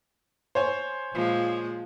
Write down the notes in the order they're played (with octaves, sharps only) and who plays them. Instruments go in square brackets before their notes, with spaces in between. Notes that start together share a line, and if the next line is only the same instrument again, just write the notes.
[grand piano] C5 C#5 G#5
[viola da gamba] A#2 F3 G#3